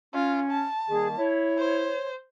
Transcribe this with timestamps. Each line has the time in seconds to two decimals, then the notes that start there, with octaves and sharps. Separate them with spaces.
0.14 C#4 F4
0.51 A5
0.89 D#3 G3 A#3 G#4
1.17 E4 C#5
1.58 C5